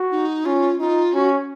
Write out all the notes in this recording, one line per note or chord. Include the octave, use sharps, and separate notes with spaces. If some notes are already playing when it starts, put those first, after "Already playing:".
Already playing: F#4
D#4
C#4 F4
D#4 F4
C#4 F#4